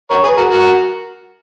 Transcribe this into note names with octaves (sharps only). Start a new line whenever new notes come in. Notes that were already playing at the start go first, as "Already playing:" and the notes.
A#4 C#5
G#4 B4
F#4 A#4
F#4 A#4